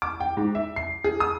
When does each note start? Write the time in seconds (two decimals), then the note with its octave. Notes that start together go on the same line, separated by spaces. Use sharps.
0.02 D6
0.20 G5
0.37 G#2
0.55 E5
0.76 C7
1.04 G#4
1.20 D#6